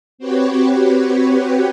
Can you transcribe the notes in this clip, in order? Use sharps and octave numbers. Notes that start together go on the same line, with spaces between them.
C4 F#4 G4 B4 C#5